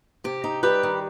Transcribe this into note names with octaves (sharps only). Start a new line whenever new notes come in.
C3 G4
D#4
G3 G4 B4
D#3